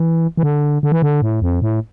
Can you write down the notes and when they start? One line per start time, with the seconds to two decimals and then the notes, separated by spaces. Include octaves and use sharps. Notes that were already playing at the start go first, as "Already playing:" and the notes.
Already playing: E3
0.37 E3
0.43 D3
0.83 D3
0.92 E3
1.02 D3
1.22 A2
1.42 F2
1.62 A2